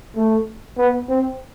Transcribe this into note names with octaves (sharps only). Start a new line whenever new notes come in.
A3
B3
C4